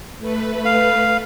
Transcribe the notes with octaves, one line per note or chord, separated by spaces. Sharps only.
A3 B4
F5